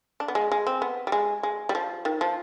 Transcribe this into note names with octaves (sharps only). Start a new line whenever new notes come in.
D4
B3
G#3
G#3
C4
B3
G3
G#3
G#3
G3
F3
D#3
F3